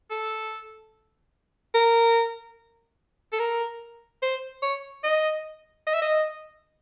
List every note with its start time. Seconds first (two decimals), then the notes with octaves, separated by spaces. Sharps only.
0.11 A4
1.74 A#4
3.33 A4
3.39 A#4
4.22 C5
4.62 C#5
5.04 D#5
5.87 D#5
5.94 E5
6.02 D#5